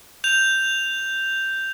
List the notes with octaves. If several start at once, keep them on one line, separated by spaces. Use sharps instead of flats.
G6 F7